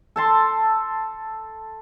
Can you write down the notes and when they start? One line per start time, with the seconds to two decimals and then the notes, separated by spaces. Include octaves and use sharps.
0.16 A4 A5 C6